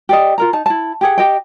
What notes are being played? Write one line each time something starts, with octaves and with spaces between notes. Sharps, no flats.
G4 D5 D#5
F4 A#4 A#5
D#4 A5
E4 A5
G4 G#4 F#5
G4 D#5 G5